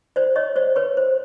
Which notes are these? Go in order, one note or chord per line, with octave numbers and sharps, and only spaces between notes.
C5 D5
C#5 D#5
C5 D5
B4 C#5
C5